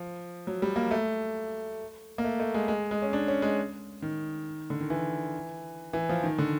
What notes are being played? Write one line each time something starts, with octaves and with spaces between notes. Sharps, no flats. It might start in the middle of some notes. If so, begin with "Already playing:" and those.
Already playing: F3
F#3
G3
A#3
A3
A#3
A3
A3
G#3
G#3
G#3
C#4
D4
C#4
G#3
D#3
D3
D#3
E3
E3
F3
D#3
D3